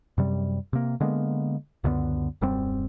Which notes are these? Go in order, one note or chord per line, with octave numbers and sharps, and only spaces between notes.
F#2 C3 G3
C3 A#3
D3 G#3 A#3 B3
C#2 F#2 D3 B3
D#1 F#2 G3 C4